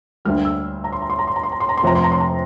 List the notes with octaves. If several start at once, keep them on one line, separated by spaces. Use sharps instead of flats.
D2 D3 G3 A#3 F6
E6
A#5
C6
A#5
C6
A#5
C6
A#5
C6
A#5
C6
A#5
C6
F1 F2 C3 A#5
C6
A#5
C6
A#5